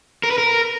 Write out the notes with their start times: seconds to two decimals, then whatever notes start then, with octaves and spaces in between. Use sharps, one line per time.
0.24 A#4
0.31 B4
0.38 A#4